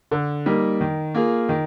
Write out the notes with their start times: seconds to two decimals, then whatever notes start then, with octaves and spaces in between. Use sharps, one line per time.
0.11 D3
0.46 G3 A#3 D#4
0.81 D#3
1.15 A#3 F4 G#4
1.49 D#3